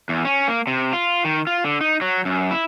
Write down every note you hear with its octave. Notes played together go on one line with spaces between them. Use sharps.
E2
C#4
A#3
C3
F4
D#3
F4
D3
D#4
F#3
F#2
E4